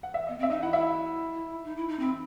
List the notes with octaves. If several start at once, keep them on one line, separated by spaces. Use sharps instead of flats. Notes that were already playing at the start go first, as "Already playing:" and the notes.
F#5
E5
B3 D#5
C4 E5
D#4 D#5
E4 F#5
E4 E5
D#4
E4
D#4
C4 B5